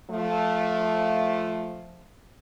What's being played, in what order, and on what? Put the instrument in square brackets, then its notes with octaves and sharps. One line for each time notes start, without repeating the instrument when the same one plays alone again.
[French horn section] F3 A3